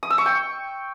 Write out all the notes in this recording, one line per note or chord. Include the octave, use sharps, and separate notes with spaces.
D#6
E6
C#6
G5